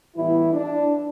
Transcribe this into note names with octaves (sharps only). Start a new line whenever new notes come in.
A2 E3 G3 B3 E4
D4